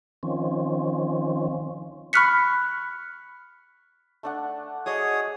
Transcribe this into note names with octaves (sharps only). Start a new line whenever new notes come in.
D#3 F3 C4 C#4
B5 C#6 F6 F#6 B6 C#7
A3 D4 F#5
F#4 G#4 C#5 D#5 D#6